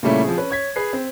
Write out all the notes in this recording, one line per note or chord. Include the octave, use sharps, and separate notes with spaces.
A#2 C#3 G3 A3 C#4 E4
F3 C4 G#4
C#4 B4
C#5 G#6 B6
G#4 B4 G#6 C7
C4